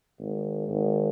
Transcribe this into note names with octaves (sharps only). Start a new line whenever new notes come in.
G#1
G#1